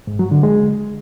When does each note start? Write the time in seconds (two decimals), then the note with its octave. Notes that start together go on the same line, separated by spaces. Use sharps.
0.07 G#2
0.19 F#3
0.31 D3
0.43 G#3